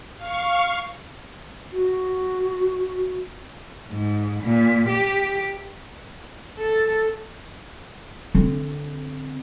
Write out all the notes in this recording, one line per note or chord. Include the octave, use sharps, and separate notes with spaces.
F5 C#6
F#4
G#2
A#2
G4
A4
D3 C4